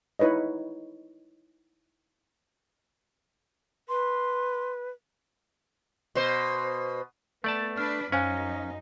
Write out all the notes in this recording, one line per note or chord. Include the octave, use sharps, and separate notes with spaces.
D#4 E4 B4 C#5 D#5
B4 C6
B2 C5
A3 B3 D5 A5
D4 B4 F6
F#2 C#4 D#4 C5 F5 G#5